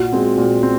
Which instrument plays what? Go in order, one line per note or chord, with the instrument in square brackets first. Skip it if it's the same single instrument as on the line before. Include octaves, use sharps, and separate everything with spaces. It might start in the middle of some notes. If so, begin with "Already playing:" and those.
Already playing: [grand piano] A#2 [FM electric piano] F#4
[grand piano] G#3 C4
A#2
C4